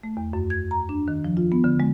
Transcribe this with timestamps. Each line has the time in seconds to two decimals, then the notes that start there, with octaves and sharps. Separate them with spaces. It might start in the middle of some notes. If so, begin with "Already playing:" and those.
0.03 A3
0.17 E2
0.33 F#2
0.50 G#6
0.71 A#5
0.89 D4
1.08 D#3
1.25 F3
1.37 F4
1.52 B3
1.64 D3
1.80 G#3